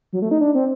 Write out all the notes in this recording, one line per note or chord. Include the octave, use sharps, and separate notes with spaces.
F#3
A3
D#4
D4
C4